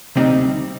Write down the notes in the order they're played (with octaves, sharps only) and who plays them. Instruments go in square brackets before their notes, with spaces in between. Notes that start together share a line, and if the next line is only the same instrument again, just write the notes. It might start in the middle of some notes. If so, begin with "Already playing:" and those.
[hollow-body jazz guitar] D2 C3 G3 C4 D#4